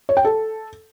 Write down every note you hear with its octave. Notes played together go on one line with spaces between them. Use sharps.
C#5
G5
A4